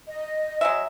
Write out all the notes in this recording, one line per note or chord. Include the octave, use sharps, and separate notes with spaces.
D#5
F#3 G#3 E5